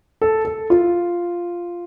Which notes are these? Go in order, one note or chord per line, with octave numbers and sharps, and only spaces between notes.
A4
A4
F4